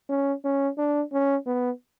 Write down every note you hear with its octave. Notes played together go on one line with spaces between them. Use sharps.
C#4
C#4
D4
C#4
B3